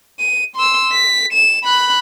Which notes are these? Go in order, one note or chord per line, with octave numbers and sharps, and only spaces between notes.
D#7
C6 E6
B6
E7
B5 F#6